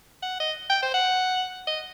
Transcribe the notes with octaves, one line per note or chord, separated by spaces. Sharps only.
F#5
D#5
G5
C5
F#5
D#5